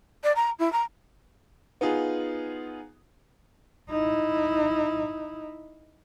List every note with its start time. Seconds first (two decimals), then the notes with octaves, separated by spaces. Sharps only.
0.24 D5
0.36 A#5
0.59 E4
0.73 A#5
1.81 B3 D#4 F4 G#4
3.90 D#4 E4